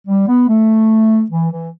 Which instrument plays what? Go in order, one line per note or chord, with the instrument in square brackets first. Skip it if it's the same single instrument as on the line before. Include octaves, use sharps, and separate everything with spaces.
[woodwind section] G3
B3
A3
E3
E3